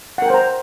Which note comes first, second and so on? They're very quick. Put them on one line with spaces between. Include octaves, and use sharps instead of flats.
F#5 A#4 G5 C5 A#5